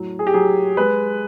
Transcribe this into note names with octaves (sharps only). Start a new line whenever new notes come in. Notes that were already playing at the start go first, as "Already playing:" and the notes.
Already playing: A2 F#3
G#4
G4
F#3 G#4
G#3 B4